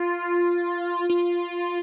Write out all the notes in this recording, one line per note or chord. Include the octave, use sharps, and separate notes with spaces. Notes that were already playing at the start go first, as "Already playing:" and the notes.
Already playing: F4
F4